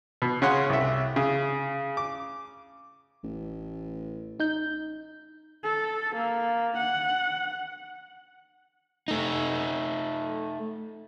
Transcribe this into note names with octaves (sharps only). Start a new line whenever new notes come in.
B2
C#3 C#5 F#5 C6
C2 E5
C#3
D6
A1
D#4 G6
A4
A#3
F#5
A3 D#4